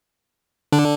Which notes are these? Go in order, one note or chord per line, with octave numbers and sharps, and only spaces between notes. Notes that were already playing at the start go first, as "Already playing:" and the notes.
D3 D4